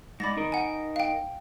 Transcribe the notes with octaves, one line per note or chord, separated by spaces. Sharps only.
G#2 D5 B5 A6 A#6
D#4 A#4
F#5 G#5
F5 G5